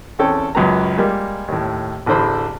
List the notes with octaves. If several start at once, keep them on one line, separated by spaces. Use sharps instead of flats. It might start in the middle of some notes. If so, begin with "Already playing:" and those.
E2 C4 C#4 A4 C#5 G5
C#2 F#2 F#3 B4 A#5
G3 G#3 A#3
D#2 A2
A1 E2 D3 C5 B5